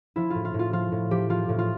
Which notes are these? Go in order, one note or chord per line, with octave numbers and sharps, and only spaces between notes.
F3 E4
A2 F4
F4
A2
F4
F3 F4
A2
F3 G4
F3 F4
A2
F4